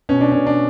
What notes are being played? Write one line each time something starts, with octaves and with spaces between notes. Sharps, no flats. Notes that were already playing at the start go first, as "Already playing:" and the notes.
B2 C#4
D4
B2 C#4
D4